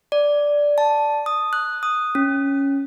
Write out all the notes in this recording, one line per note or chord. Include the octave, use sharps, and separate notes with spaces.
D5
A5
D#6
F#6
D#6
C#4